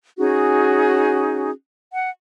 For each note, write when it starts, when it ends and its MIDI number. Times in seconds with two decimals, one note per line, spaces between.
0.17 1.50 61
0.17 1.50 63
0.17 1.50 66
0.17 1.50 68
1.92 2.09 78